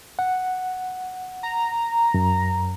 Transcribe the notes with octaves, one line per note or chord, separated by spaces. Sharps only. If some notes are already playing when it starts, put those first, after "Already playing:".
F#5
A#5
F#2